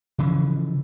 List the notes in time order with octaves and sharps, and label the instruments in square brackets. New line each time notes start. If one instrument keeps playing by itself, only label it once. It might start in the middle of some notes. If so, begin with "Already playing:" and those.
[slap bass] C#3 E3 F3